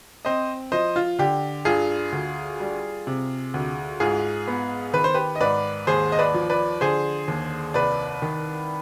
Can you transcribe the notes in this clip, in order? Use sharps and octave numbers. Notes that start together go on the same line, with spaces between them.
C4 C5 D#5
F3 C5 D#5
F4
D3 G4
G2 F4 G#4
D2
G3
C3
D2
G#2 F4 G#4
B3
D#3 B4
C5
G4 B4
D#5
G#2 B4 D5
D#2 G#4 C5
D#5
B4 D5
F3
B4 D5
D3 G#4 C5
D#2
C2 B4 D5
D#3